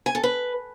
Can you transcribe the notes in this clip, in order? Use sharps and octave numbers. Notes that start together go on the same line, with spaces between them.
G#5
A4
B4